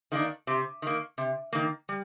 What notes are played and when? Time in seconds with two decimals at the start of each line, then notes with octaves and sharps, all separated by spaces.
0.12 D#3 A#3 D4
0.47 C3
0.82 D#3 A#3
1.18 C3
1.53 D#3 A#3
1.89 G3